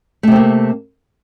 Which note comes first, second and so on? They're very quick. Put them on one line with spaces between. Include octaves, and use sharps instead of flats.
A3 C3 C4 A#3